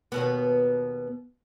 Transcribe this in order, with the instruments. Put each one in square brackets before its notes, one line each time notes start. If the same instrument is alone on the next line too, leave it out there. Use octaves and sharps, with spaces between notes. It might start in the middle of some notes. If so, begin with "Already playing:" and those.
[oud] D#2 B2 B3